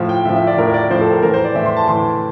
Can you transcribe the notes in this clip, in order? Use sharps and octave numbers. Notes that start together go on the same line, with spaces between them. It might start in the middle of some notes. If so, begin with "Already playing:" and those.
Already playing: A2 F3
G5
A2 F3 E5
E5
D5
A2 F3 A#4
D5
A2 F3 C5
A4
A#4
A2 E3 A#4
C5
D5
A2 E3 E5
C6
A5
A2 E3 C6